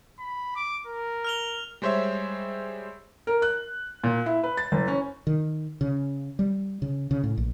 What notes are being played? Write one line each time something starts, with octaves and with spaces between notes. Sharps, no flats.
B5
D6
A#4
F6 F7 G7
G3 G#3 C5 C#5 E5
A#4
F#6
A#2
E4
B4
A6
F#1
C#4
D#3
C#3
G3
C#3
C#3
A2
A#1